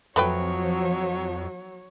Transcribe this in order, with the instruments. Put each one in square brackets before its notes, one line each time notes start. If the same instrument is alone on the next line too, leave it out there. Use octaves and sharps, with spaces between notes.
[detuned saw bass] F2 [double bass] F3 [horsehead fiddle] F#3 C#5 [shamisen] A3 B4 G5